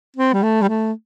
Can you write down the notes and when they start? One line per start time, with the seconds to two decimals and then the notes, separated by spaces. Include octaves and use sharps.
0.17 C4
0.33 G3
0.43 A3
0.62 G3
0.69 A3